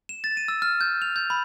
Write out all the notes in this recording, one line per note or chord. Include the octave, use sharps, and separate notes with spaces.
E7
A6
D#7
E6
F6
G6
F7
G6
B5